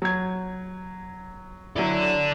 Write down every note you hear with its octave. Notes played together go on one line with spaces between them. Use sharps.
F#3 G#6
F#3 E4 A4 D5